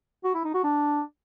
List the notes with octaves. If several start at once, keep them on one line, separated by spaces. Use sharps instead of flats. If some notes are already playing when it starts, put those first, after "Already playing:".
F#4
E4
D#4
F#4
D4